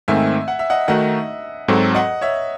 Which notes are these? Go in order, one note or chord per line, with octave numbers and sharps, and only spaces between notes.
G#2 D#3 A3 C4 E5 G#5
F#5
E5
D#5 F#5
D#3 A3 D#4 F#4 D#5 F#5
G#2 F#3 C4 F#4 A4
D#5 F#5
C#5 E5